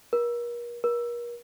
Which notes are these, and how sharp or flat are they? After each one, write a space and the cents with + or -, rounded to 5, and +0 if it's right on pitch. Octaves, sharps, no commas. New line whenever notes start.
A#4 +40
A#4 +40